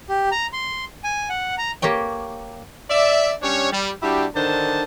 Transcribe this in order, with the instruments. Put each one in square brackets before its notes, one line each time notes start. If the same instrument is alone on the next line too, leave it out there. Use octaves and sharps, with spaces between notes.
[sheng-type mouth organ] G4
A#5
C6
G#5
F#5
A#5
[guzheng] A#3 G4 C#5 G5
[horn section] D5 E5
G3 C#4 D4 C#5
G3
G3 D4 E4 F#4 G4
D3 D#3 D4 C5 A5